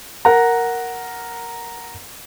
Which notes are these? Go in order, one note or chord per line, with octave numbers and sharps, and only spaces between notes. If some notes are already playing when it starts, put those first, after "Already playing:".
A#4 F#5 A#5